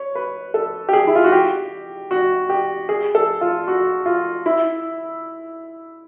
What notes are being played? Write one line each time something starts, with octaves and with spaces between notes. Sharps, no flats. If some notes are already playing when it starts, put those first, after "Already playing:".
Already playing: C#5
B4
A4
G4
G#4
E4
F4
F#4
G4
F#4
G4
G#4
A4
F4
F#4
F4
E4